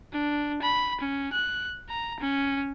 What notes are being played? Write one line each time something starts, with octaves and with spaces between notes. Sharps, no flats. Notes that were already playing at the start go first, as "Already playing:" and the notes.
D4
B5
C#4
F#6
A#5
C#4